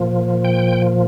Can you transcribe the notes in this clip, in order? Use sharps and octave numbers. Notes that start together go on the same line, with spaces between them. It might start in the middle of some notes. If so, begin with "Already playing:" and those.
Already playing: A#2 F3
G5